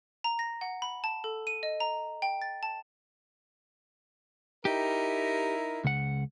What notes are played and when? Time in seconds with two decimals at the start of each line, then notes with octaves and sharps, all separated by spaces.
0.24 A#5
0.39 A#6
0.61 F#5
0.82 B5
1.04 A5
1.24 A4
1.47 D#7
1.63 D#5
1.80 A#5
2.22 G5
2.42 A6
2.63 A5
4.65 D#4 E4 G4 A#4
5.84 C#2 F#5